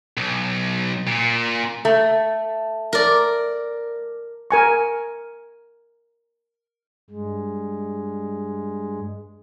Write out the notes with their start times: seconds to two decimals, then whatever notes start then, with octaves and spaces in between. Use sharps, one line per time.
0.17 B1
1.08 A#2
1.85 A3
2.93 A#4 D5
4.51 A#4 G#5 C#6
7.10 G2 G#3